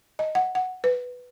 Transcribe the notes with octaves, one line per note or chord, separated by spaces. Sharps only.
D#5
F#5
F#5
B4